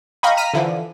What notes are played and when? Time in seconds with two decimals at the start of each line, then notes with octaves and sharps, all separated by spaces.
0.23 D#5 F5 G5 A#5 B5 C#6
0.37 A#5 F6 B6 D#7
0.54 D3 E3 F3